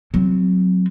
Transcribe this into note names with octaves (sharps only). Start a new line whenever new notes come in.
F#3 C4